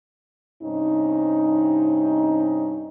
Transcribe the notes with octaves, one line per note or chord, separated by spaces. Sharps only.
G2 C3 C4 C#4 D#4